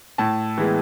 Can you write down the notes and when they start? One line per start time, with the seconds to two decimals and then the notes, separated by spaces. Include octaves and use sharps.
0.18 A2 A5
0.58 E3 G#3 B3